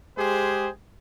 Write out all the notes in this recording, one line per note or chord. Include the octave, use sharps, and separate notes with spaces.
G#3 G4 G#4 C5